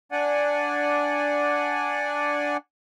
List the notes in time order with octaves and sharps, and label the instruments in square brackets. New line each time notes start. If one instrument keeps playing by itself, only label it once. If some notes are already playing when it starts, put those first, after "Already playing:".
[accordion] D4 D5 F#5 G#5